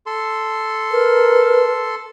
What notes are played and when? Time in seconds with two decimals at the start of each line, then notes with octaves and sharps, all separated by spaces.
0.06 A4 C6
0.92 A#4 B4